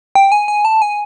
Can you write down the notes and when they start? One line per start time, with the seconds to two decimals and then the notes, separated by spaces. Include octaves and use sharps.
0.15 G5
0.32 G#5
0.48 G#5
0.65 A5
0.82 G#5